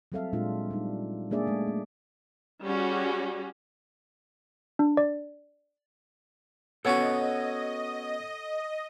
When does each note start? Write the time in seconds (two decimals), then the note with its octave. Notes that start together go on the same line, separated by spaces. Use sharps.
0.12 F#3 G3 C4 A4 E5 F5
0.33 A#2 G#3 D4 F4
0.70 G3 D#4
1.31 G#3 A#3 D4 G#4 D5 E5
1.47 G#3 A3
1.68 A3
2.64 G3 C#4 F#4 G#4
4.79 D4
4.97 D5
6.85 B3 C#4 F#4 A4 C#5 D#5 F#5